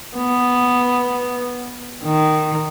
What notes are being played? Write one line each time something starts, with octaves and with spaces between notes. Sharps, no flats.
B3
D#3